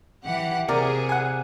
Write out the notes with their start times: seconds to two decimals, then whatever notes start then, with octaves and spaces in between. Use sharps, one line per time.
0.24 E3 G4 F#5
0.69 C3 G#4 A#4 D5
1.09 F#5 G#5